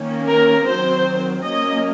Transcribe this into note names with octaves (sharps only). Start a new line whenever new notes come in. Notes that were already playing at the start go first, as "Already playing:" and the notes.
Already playing: D#3 A#3 C#4
A#4
D#3 F#3 C4 C5
F#3 A#3 C#4 D#5